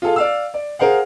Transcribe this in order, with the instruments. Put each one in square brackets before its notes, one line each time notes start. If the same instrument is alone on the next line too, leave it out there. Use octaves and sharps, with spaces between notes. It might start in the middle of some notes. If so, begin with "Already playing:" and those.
[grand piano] F4 G#4 A4 F5
D5 F5 E6
D5
G#4 A#4 C5 F5 F#5